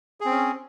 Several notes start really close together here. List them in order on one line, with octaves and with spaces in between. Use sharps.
G#4 C4 C#4